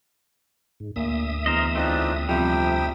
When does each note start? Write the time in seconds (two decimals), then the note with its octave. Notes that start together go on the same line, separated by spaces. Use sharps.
0.80 G#2
0.96 D2 A#2 E5 D#6
1.46 E2 A#4 C5 D#5
1.76 A3 C4 D4 D#4 F4
2.28 F2 C3 G3 G5